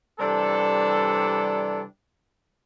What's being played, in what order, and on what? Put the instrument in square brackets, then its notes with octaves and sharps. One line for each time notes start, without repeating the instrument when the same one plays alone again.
[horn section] C3 E3 G3 D4 A4